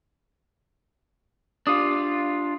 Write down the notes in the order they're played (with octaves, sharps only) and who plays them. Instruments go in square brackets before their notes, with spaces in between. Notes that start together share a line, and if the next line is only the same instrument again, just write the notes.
[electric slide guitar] D4 F4 [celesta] G4 D6 D#6